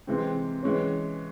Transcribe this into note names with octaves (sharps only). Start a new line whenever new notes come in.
C3 E3 G#3 C4
E3 G#3 C#4